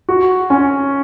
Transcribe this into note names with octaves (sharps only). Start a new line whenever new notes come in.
F#4
C#4